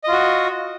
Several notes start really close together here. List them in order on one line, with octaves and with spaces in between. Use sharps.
D#5 F4 F#4